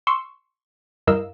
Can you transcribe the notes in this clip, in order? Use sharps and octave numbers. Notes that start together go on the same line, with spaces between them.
C6 C#6 E6
G2 E4 A#4 D#5 F5 E6